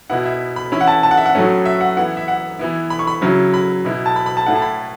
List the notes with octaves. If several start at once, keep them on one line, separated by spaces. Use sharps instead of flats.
B2 B3 E4 F#5
E5
B5
E3 C#4 E4 B5
F#5
A5
A5
F#5
E5
F#5
A2 F#3 A3 C#4
E5
F#5
E3 B3 E4 F#5
E5
F#5
E3 B3 E4
B5
C#6
B5
C#3 F#3 C#4 E4
B5
B2 B3 E4
A5
B5
B5
A5
A2 A3 E4 F#5
A5
B5